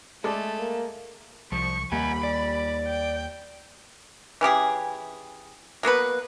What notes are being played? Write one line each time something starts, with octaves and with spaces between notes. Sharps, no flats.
G#3 A3 A4 D5
A#3
C2 F3 C#6
D#2 G3 A#3 F#5 G#5 B5
D5
G5
E3 C#4 G4 G#4
F#3 A#3 B3 B4